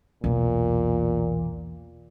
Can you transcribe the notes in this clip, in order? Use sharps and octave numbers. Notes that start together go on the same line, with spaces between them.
B1 E2 A#2